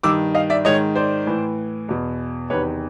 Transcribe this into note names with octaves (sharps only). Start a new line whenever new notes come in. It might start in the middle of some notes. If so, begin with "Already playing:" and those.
G2 D#3 D6 E6
D#5 F5
D5 E5
G#2 D#3 C#5 D#5
C5 D5
A2 E3
E2 B2
E2 C3 D#3 B4 C#5